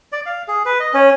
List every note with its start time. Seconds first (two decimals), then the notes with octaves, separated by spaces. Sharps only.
0.12 D5
0.26 F5
0.48 G#4
0.65 B4
0.80 D#5
0.94 C#4